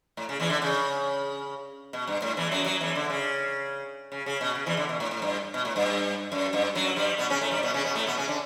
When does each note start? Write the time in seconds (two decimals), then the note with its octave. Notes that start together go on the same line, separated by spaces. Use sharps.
0.17 A2
0.29 C#3
0.40 E2 E3
0.50 D3
0.62 C#3
1.93 B2
2.07 G2
2.22 A2
2.37 E2 E3
2.51 F#2 F#3
2.65 F#2 F#3
2.81 E2 E3
2.95 D3
3.10 C#3
4.12 C#3
4.26 C#3
4.41 B2
4.55 C#3
4.66 E2 E3
4.77 D3
4.89 B2
5.00 A2
5.11 A2
5.22 G2
5.54 B2
5.65 A2
5.76 G2
6.32 F#2
6.53 G2
6.75 F#2 F#3
6.96 G2 G3
7.18 B2 B3
7.30 C#3 C#4
7.41 A2 A3
7.51 G2 G3
7.63 B2 B3
7.74 C#3 C#4
7.84 B2 B3
7.95 A2 A3
8.07 B2 B3
8.17 C#3 C#4
8.28 D3 D4